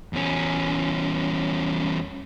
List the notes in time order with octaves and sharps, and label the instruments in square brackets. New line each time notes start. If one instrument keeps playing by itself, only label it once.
[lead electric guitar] E2 C#4